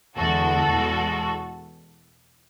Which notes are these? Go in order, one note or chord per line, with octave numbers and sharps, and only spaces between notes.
E2 D3 G#3 F#4 A4
E2 B2 G#3